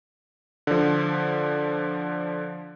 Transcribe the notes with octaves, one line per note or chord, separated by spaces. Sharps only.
D3 F3